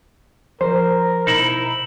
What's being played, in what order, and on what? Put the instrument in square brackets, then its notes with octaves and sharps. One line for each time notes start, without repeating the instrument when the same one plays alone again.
[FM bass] F3 [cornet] A#4 [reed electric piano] C5
[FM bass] B2 [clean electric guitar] D#4 E4